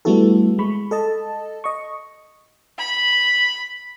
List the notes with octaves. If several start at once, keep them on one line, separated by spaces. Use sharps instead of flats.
G3 A3 B3 E4 F#4 A4
G#3 B5 C#6
A4 D#5 A5
D#5 C#6
B5